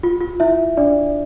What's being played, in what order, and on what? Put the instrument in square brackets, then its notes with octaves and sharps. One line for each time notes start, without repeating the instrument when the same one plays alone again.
[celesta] F4
F4
E4 E5
D4 D5